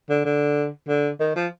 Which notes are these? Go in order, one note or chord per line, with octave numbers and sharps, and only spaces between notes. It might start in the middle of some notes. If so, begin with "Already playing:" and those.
D3
D3
D3
D#3
F3